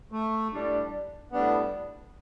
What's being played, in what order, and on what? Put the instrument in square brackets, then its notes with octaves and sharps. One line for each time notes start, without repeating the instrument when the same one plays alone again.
[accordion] A3
[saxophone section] A2 G3 D4
[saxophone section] A2 G3 D4 [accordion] B3